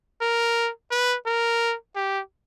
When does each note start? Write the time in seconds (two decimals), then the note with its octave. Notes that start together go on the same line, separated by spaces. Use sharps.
0.21 A#4
0.91 B4
1.26 A#4
1.96 G4